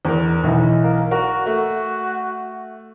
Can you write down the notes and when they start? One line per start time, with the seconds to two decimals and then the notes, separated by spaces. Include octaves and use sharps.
0.05 E2 A#4
0.43 B1 E3
0.83 A#3
1.11 F#4 A#4
1.46 A3 F#4